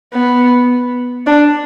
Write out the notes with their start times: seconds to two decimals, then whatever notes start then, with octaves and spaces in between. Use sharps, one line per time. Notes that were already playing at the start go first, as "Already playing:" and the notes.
0.13 B3
1.27 D4